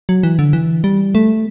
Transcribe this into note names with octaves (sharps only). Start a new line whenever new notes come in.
F#3
E3
D3
E3
G3
A3